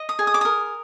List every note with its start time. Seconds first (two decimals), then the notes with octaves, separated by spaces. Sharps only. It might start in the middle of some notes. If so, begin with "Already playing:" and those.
Already playing: D#5
0.09 D#6
0.19 G#4
0.27 D#6
0.34 D6
0.41 A#4 D#6